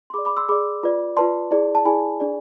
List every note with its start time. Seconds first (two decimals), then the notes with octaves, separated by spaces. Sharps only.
0.10 C6
0.14 G#4 B5 D6
0.18 D5
0.25 B5 D6
0.37 C6 E6
0.49 G#4 D5 B5 D6
0.83 F4 B4 D5
1.16 F4 B4 D5 A5 C6
1.51 E4 G#4 D5
1.75 A5
1.85 E4 G#4 D5 G#5 B5
2.20 D4 G#4 D5